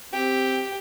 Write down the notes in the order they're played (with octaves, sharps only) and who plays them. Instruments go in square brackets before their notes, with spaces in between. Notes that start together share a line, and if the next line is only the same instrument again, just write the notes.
[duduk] C4 [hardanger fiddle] G4